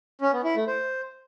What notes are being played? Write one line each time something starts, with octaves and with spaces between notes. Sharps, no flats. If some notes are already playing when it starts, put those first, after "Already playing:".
C#4
B3
E4
A3
C5